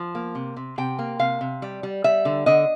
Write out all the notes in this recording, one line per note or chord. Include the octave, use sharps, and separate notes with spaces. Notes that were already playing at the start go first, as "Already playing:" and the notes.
Already playing: F3
A#3
C3
C3
C3 G5
A#3
C3 F5
C3
G3
G3
G3 E5
D3
D3 D#5